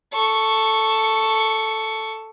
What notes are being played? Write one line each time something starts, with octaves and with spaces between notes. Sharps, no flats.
A4 C#6